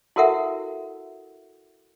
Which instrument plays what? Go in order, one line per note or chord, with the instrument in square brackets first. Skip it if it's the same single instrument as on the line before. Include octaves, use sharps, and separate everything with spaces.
[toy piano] E4 F#4 A4 A#4 E5 F#5